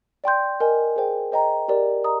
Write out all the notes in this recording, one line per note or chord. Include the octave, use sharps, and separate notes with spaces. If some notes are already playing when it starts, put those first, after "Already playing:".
D5 G5 C6 G6
A#4 D#5 G#5
G#4 C5 G5
C5 D#5 G5 A#5
G4 A#4 D5
D#5 A#5 D#6